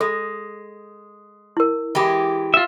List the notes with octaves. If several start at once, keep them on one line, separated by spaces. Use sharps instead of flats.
G#3 A4
E4 A#4
E3 G#3 G4
F4 E5